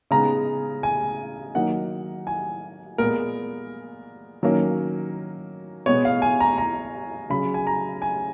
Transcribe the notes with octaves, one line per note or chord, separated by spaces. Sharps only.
C#3 G#3 B3 D#4 A#5
G#5
D#3 F#3 A#3 D#4 F#5
G#5
A#2 G#3 B3 A#4
D#3 F#3 A#3 C#4
B2 G#3 B3 C#5
F5
G#5
A#5
A#5
C#3 F#3 C#4 B5
G#5
A#5
G#5